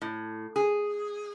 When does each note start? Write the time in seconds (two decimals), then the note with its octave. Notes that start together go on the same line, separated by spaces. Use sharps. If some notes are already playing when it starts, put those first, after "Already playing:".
0.02 A2
0.56 G#4